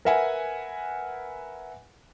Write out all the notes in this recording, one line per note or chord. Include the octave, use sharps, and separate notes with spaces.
A#4 B4 E5 F#5 G#5